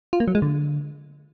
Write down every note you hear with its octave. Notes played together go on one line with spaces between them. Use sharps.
F4
A#3
F#3
G#3
D3